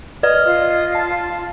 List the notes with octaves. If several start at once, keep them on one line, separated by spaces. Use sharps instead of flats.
B4 D5 D#5 F6
F4
A5